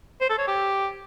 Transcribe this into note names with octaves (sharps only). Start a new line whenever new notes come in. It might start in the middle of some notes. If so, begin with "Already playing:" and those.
C5
A4
C#5
G4